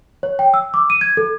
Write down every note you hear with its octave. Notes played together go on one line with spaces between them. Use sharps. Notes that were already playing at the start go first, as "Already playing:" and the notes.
C#5
G5
E6
D6
D#7
G#6
A4